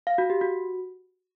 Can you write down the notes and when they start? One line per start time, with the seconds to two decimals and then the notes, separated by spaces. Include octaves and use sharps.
0.07 F5
0.18 F#4
0.30 G4
0.41 F#4